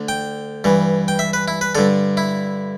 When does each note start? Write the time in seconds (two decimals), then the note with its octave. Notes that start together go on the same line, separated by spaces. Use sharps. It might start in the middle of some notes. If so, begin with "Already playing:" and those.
Already playing: D2 D3
0.09 G5
0.64 G2 E3
1.08 G5
1.19 E5
1.33 B4
1.48 E4
1.61 B4
1.75 G2 D3 A4
2.17 E4